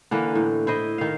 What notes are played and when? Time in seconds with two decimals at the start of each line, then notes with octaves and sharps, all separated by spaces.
0.11 D3 E3 A#3
0.35 A2
0.67 E4 C5 D#5
0.98 D#3 F5